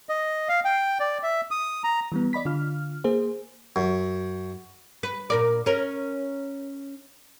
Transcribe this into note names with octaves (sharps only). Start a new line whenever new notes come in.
D#5
F5
G5
D5
E5
D#6
A#5
E3 G3 B3
D5 D#5 B5 B6
D3 F4 F6
A#3 G#4 C5
F#2
B4
A#2 A#4 D5
C#4 A#4